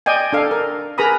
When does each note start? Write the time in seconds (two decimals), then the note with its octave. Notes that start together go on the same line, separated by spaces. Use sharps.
0.06 D5 D#5 G5 G#5
0.33 D4 A4 F5
0.51 A#4
0.98 G#4 A#4 B4 A#5 B5 D#6